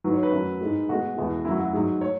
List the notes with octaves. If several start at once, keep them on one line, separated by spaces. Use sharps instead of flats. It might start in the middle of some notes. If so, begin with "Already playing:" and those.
G#2 F#3 B4
C#5
B4
F#2 F#3
G#2 G#3
B2 G#3 F#4
E2 B2 G#3
F#2 F#3 E4
F#4
G#2 F#3 G#4
C#5